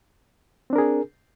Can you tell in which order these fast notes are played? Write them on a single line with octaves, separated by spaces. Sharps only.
C4 D4 A#4 G#4